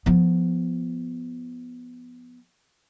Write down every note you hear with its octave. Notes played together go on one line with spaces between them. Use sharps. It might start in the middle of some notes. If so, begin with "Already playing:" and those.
F3 B3